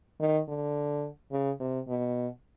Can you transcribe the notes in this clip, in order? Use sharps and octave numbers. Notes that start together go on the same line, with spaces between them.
D#3
D3
C#3
C3
B2